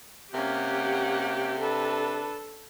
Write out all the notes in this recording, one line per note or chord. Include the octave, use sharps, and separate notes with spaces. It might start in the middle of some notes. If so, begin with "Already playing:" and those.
C3 A#3 C#4 G4 F#5
D4 A4 B4